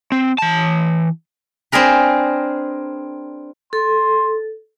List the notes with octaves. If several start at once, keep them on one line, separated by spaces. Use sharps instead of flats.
C4
E3 A5
C4 D4 G#4 A#4 B4
A4 C6